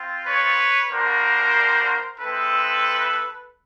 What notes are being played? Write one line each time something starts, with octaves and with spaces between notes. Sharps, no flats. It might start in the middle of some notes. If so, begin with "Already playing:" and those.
Already playing: C4 F4
B4 C#5
G3 A#3 D4 F#4 A#4 C5
G#3 C4 E4 A4 B4